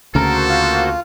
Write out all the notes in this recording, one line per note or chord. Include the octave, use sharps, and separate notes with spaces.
D2 C#3 A#3 F#4 A4 A#4 C5
F4